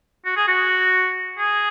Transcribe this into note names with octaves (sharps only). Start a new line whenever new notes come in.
F#4
G#4
F#4
G#4